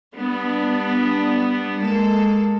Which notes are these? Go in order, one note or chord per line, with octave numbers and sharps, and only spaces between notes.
G3 B3 D4
G#3 A#3 A4